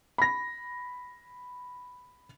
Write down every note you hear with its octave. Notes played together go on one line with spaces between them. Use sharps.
B5 A#6